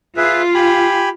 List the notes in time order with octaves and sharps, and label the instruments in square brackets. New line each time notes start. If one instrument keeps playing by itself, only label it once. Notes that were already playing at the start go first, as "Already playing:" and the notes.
[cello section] F4 [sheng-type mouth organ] G#4 B4 E5
[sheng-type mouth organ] G4 G#5 B5